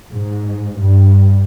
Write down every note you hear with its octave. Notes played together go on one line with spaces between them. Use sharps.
G#2
G2